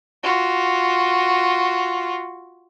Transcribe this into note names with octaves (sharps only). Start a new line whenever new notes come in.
F4 F#4